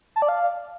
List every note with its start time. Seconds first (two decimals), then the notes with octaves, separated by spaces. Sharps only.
0.16 A5
0.22 D5
0.29 F5